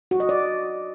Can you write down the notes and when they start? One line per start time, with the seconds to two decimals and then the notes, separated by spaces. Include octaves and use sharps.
0.11 F#4
0.20 D#5
0.29 D5